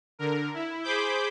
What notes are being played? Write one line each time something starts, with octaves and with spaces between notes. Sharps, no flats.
D3 A#4
E4
G#4 C5 B5 D6 G6